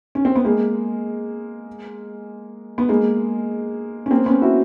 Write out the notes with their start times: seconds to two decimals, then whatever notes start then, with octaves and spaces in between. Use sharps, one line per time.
0.15 C#4
0.25 C4
0.36 B3
0.45 G#3 A#3
2.78 B3
2.89 G#3 A#3
4.06 C#4
4.11 A#3 C4
4.26 B3 C#4
4.42 E4 F#4